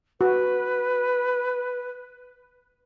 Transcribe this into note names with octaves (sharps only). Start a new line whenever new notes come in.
F#4 B4